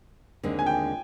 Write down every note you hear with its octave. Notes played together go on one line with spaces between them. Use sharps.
D#2 D3 G#3 C4 D#4
G#5
G5